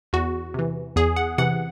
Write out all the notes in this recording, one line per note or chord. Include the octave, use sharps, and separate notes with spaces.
E2 F#4
C3 E3
E2 G#4
F#5
C3 E3 F#5